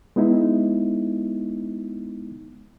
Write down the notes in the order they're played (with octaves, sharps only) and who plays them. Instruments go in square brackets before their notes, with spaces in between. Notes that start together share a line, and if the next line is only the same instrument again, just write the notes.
[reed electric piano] G#3 B3 D#4 E4